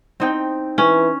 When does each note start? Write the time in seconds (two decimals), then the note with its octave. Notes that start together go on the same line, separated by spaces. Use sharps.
0.20 C4 D#4 G5
0.78 E3 C#4